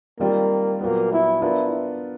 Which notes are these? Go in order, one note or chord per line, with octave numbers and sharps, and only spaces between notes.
D#3 G3 A#3 C4 F4
A#2 F#3 A#3 B3
E4
B3 D4 E4 F4 A#4